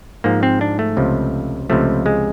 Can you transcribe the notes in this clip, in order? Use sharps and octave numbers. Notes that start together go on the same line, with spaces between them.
G#2 F3 A#3
C4
D4
A3
C#2 C3 F3
C#2 C3 F3 A3
G#3